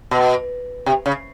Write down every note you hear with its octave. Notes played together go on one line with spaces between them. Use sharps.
B2
C3
C#3